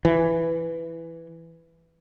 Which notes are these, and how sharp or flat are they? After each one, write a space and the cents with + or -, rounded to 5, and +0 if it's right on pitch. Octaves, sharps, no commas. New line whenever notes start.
E3 +5